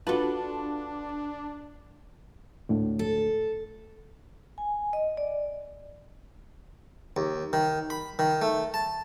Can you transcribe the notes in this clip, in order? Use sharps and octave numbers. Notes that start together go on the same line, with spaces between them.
D4 F4 F#4 A4 B4
D2 A2 D3
A4
G#5
D#5
D5
D#2
D#3
B5
D#3
A3
A5